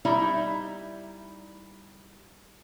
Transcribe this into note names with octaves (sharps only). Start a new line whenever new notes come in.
G3 D#4 E4 D5 E5